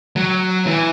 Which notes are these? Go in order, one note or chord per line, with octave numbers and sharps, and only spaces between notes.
F#3
E3